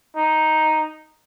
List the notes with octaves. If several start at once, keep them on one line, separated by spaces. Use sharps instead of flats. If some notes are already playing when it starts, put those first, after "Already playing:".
D#4